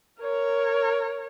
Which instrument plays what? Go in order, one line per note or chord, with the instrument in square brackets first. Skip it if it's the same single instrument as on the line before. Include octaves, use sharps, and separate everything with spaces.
[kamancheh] A#4 C#5